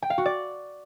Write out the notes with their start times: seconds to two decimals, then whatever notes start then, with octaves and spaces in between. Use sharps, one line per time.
0.02 G5
0.10 F5
0.18 F#4
0.26 D5